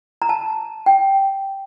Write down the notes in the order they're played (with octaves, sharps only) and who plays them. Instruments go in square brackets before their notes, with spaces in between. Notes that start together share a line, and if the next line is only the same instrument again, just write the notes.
[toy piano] A#5
A5
G5